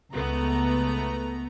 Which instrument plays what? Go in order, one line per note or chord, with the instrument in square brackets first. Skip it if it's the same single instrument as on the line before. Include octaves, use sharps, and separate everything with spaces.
[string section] C#2 A3 B3 A#5